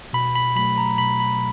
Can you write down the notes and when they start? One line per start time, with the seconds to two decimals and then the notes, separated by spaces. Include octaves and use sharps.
0.13 B2 B5
0.35 B5
0.56 F#3 A3 B5
0.78 A#5
0.98 B2 B5
1.20 B5